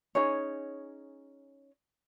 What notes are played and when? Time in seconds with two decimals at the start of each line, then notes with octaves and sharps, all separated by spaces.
0.15 C#4 D#4 G#4 C#5